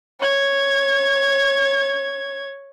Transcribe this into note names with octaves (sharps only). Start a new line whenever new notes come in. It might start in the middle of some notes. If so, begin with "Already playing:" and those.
C#5 G#6